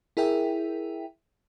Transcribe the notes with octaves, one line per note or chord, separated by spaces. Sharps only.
E4 G#4 A#4 E5 G5